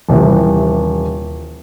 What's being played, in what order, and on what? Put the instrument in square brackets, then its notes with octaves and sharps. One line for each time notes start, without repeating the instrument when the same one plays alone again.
[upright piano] D#1 C3 E3